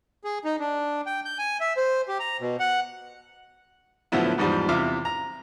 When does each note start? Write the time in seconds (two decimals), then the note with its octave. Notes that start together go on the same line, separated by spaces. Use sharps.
0.24 G#4
0.45 D#4
0.59 D4
1.06 G5
1.25 G6
1.38 G#5
1.61 E5
1.77 C5
2.08 G4
2.20 A#5
2.41 B2
2.60 F#5
4.12 A2 D3 F3 F#3 B3 E4
4.38 E2 G#2 F3 G3
4.69 E2 C3 F4 E5 D6 F6
5.05 A#5